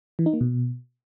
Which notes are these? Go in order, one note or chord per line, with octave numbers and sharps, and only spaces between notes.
E3
D#4
A#3
B2